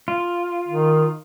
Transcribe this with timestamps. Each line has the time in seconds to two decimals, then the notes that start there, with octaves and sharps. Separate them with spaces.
0.08 F4
0.68 D#3